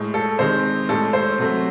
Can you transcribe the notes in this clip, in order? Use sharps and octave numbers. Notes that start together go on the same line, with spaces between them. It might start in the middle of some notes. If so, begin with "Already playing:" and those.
Already playing: A2 G#3
A4
C3 D#3 G#3 C5
A2 G#3 A4
C5
C3 F#3 A3